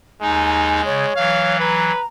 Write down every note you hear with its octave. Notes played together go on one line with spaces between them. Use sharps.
D#2 G#3 D#4 G#5
C#3 C#5
E3 F#3 F5
B4 A#5